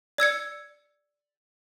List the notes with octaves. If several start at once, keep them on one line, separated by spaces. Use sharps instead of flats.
D5 E6 G#6 C#7